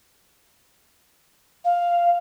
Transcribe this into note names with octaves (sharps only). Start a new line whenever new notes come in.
F5